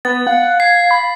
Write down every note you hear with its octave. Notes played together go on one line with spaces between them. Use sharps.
B3 A6
F5 F#5
G#6 C7
B5